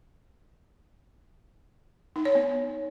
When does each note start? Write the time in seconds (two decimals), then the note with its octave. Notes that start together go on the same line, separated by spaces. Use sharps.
2.16 D#4
2.25 C#5
2.35 B3